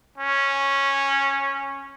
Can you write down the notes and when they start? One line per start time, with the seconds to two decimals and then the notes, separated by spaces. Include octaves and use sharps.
0.18 C#4